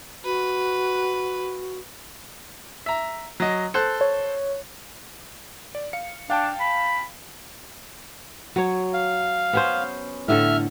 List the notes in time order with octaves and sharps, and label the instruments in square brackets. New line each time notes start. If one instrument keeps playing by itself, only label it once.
[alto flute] F#4 [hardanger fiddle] B4
[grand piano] E5 A#5
F#3 D#5
A4 C5 F#6
[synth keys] C#5
[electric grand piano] D5
F5 C#7
[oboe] D4 [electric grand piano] F5 G5 A5
[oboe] B5
[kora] F#3 C#5
[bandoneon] F5
[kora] B3 C#4 C5
[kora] A2 D3 A4 [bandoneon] E5 F6